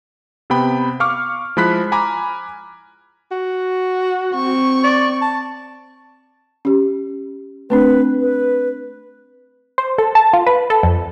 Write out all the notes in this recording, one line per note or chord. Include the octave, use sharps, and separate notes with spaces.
C3 B3 G5 B5
F5 C#6 D6 F6
F3 G#3 E4 B5 F#6 B6
G#5 A#5 B5 D6
F#4
C4 C#6
D5
A5
C#4 G4
A3 C4 D4 B4
B4
C5
A4
A5
F4
B4
A4
F2